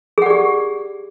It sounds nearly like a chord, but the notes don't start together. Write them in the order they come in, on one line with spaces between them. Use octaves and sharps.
G#4 F#5 D5 G4